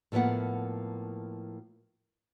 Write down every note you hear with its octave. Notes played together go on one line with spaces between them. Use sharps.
A2 F3 A#3 B3 F#5